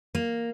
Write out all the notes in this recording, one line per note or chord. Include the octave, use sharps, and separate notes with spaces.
A#3